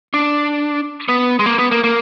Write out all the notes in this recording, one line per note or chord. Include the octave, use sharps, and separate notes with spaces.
D4
B3
G#3
A#3
B3
A#3
A#3